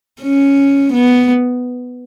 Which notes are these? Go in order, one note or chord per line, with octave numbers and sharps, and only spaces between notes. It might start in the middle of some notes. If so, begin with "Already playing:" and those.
C#4
B3